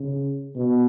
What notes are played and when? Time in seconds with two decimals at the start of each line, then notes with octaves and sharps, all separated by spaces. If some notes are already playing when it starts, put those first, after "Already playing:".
Already playing: C#3
0.55 B2